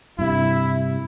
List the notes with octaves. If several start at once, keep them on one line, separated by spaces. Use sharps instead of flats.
G2 C3 E4